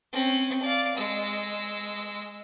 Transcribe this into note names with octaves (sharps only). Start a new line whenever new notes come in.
C4 C#4
D5 F5
G#3 E6